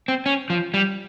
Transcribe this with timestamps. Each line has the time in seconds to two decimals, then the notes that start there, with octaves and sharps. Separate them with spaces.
0.08 C4
0.26 C#4
0.50 F3
0.74 G3